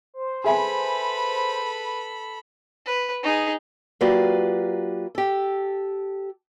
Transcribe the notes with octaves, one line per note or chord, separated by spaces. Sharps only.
C5
G#4 A4 B4 E5 G#5 B5
B4
D#4 G#4
F#3 A#3 F4 G4 B4 D5
G4 A4